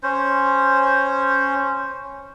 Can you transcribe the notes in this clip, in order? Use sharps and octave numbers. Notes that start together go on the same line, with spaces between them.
C#4 C5